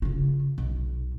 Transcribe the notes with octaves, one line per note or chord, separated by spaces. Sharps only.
C#3 F4
B1